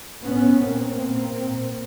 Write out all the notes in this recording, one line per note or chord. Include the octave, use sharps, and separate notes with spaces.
A2 B3 C#4
A#2 A#3 C4
A#2
A#2